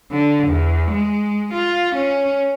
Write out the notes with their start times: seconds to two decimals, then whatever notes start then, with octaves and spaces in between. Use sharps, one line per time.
0.12 D3
0.48 E2
0.92 G#3
1.54 F4
1.96 C#4